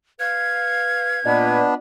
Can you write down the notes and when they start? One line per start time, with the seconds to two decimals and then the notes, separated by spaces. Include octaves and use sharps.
0.20 B4 F5 G#6
1.25 A#2 A#3 B3 D4 F4 B4 D5 D#5